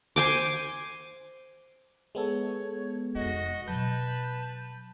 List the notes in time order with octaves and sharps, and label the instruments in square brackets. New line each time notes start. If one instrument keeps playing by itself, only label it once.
[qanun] C5 G#5 D6
[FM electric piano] G#3 B3 A4 [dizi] C#5
[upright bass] F1 D#4 [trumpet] F#4 [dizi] D#5
[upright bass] B2 F#3 [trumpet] B4 [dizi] A5 [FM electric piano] G6